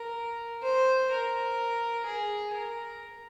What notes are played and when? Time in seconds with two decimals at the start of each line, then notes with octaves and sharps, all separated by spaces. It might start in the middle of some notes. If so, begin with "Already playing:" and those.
Already playing: A#4
0.63 C5
1.11 A#4
2.06 G#4
2.54 A#4